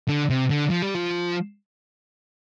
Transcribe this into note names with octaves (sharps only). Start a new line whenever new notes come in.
D3
C3
D3
F3
G3
F3